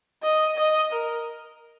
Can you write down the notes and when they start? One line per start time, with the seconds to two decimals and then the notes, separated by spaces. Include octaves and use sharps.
0.23 D#5
0.57 D#5
0.92 A#4